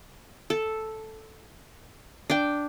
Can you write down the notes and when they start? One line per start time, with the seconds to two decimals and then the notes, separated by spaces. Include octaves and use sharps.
0.50 A4
2.30 D4 G5